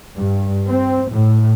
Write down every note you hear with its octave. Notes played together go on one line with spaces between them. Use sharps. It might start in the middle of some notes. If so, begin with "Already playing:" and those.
G2
C4
A2